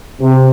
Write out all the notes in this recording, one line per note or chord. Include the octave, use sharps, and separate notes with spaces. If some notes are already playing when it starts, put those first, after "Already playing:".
C3